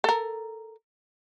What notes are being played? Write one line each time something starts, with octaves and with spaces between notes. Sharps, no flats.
A4 A#4